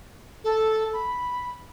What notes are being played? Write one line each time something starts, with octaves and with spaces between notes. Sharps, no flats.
A4
B5